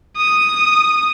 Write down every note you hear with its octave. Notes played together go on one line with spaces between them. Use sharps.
D#6